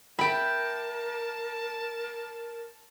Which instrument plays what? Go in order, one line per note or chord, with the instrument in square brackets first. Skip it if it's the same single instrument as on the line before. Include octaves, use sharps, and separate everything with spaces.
[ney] A#4 [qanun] E5 G5 [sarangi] A5 [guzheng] B5